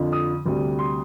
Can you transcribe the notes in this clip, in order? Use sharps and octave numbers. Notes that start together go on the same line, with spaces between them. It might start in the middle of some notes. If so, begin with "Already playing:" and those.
Already playing: F2 D3 F3
D#6
D2 C3 G3
C6